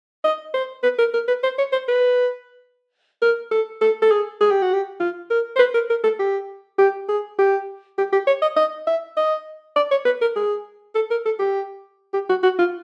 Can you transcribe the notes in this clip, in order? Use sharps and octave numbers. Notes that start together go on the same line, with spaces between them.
D#5
C5
B4
A#4
A#4
B4
C5
C#5
C5
B4
A#4
A4
A4
A4
G#4
G#4
G4
F#4
G4
F4
A#4
C5
B4
A#4
A#4
A4
G4
G4
G#4
G4
G4
G4
C#5
D#5
D#5
E5
D#5
D5
C#5
B4
A#4
G#4
A4
A#4
A4
G4
G4
F#4
F#4
F4